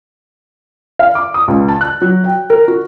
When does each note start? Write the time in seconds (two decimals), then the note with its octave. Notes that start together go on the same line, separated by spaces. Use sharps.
0.99 F5
1.15 D6
1.34 D#6
1.48 C#2
1.68 A5
1.81 F#6
2.02 F#3
2.24 G5
2.50 A#4
2.68 F#4